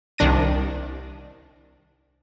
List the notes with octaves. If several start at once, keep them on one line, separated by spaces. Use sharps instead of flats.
C2 D#3 D4 A#6 D#7